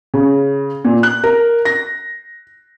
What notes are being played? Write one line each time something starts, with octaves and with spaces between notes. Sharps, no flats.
C#3
A#2
F#6
A#4
A#6